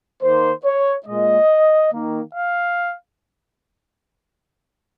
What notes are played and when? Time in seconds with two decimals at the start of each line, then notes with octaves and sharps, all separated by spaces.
0.22 D#3 A#3 C5
0.64 C#5
1.06 A#2 G#3 D#5
1.92 D#3 A#3
2.34 F5